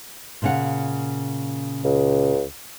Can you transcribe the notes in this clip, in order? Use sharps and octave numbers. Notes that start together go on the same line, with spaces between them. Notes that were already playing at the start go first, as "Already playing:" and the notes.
A#2 C#3 F#5
C#2